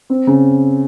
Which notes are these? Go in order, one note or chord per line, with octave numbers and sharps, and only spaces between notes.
C4
C#3